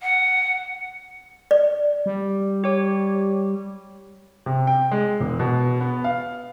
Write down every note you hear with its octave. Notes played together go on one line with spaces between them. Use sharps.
F#5
D5
G3
G4 C#5
C3
G5
G#3
E1
B2
B3
F5